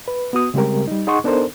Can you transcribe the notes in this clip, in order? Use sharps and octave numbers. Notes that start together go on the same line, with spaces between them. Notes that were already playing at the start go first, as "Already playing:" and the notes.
B4
B3 F#4 D#6
C#3 G3 G#3 C4 G4 A#4
G3 D#4
D#4 G#4 D#5 F#5 C6 C#6
B3 D4 D#4 A4 A#4 C5